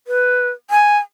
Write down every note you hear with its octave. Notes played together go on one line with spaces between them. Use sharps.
B4
G#5